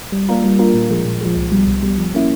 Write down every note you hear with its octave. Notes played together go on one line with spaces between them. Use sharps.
G3
A#3 D4 F4 A#4
G3
A#3 D4 F4 A#4
A#2
F3 G#3
A#2
F3 G#3
C2
B2 G3
C2
B2 G3
F3
A#3 C#4 E4